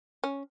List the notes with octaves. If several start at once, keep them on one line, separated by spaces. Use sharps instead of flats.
C#4